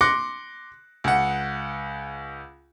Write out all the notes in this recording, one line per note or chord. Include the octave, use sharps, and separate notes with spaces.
C6 D6 F#6 A#6 C#7
C#2 F#5